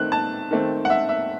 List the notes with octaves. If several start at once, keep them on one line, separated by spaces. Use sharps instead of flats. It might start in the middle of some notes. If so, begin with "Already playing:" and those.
Already playing: D#3 A3 C4 F#6
A5
D#3 A3 C4
F#5
E5
E5